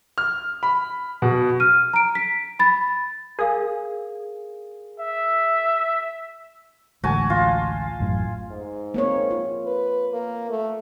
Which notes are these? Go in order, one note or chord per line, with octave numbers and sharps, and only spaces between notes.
F6
B5
B2
F6 D#7
A#5 D7
B6
B5 A6
G#4 A#4 F5
E5
A1 D2 G#3 F#4 G#5 A5
F4
A1 F#2 A2
G#2
A#3 C4 C#5
F4
B4
A#3
A3